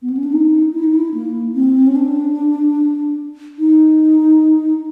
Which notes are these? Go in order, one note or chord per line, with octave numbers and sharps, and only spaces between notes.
B3
C4
C#4
D4
D#4
E4
D#4
E4
A#3
C4
C#4
D4
D#4